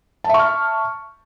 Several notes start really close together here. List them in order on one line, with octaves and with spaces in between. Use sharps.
A5 E5 C#6 F6